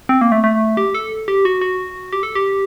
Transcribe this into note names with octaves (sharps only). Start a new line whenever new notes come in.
C4
A#3
A3
A3
G4
A4
G4
F#4
F#4
G4
A4
G4